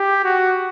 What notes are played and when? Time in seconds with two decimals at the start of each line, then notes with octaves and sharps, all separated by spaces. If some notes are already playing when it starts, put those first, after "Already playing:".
Already playing: G4
0.24 F#4